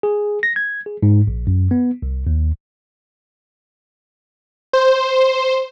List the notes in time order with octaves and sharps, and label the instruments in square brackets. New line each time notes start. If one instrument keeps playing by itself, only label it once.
[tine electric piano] G#4
A#6
G#6
G#4
G#2
A#1
F#2
B3
C2
D#2
[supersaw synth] C5